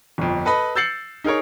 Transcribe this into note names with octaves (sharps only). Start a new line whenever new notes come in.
G1 F2
A4 B4 D#5 B5
E6 G6 A6 C7 C#7 F#7
D#4 G#4 A#4 C#5